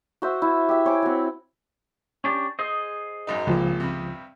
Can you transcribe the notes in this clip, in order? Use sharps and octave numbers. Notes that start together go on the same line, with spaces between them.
F#4 C5 E5
E4
G4 E5
C5 C#5 G#5 D6
C4 F#4
C#4 D4 G4
G#4 C5 D#5
G#1 F#2 D#4
G#1 C#2 A#2 F3
G2 C3